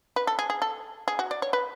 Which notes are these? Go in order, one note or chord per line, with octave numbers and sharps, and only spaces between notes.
B4
A4
G#4
G#4
A4
G#4
F#4
D5
C#5
B4